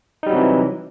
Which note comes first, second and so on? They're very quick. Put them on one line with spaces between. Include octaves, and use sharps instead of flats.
D#4 G3 F#3 C3 E3